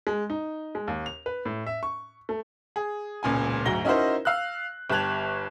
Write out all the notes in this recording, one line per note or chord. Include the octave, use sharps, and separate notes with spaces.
G#3
D#4
G#3
D#2
F7
B4
A2
E5
C#6
A3
G#4
E1 C#2 A#2 G#5
D2 G#2 F#3 A#6 G7
C#4 D#4 E4 F#4 A#4 C5
F5 E6 F#6
G1 G4 A5 F#6 G#6 F7